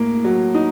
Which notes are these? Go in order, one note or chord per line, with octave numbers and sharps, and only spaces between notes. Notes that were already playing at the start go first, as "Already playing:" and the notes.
Already playing: A2 A#3
F#3
D#4